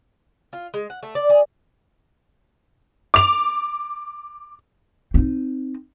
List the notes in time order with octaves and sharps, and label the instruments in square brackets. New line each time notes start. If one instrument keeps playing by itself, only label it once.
[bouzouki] F4
G#3
F#5
A3
D5
G#4
[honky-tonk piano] D6 F7
[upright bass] C4 D#4